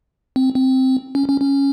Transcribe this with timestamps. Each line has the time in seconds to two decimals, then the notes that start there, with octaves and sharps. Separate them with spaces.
0.36 C4
0.55 C4
1.15 C#4
1.28 C#4
1.42 C#4